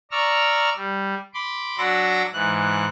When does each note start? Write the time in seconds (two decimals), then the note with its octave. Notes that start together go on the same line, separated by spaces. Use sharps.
0.11 D5 A#5 C#6 E6 F6
0.76 G3
1.34 B5 C6 D6
1.78 F#3 D4 F#5 D6 E6 A#6
2.33 G#2 E3 F#6